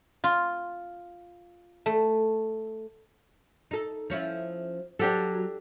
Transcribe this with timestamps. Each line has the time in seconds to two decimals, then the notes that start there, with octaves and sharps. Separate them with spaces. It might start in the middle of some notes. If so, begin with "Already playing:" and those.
0.24 F4
1.86 A3
3.71 D#4 A4
4.10 F3 C#4 E4
4.99 F#3 D4 G4 A4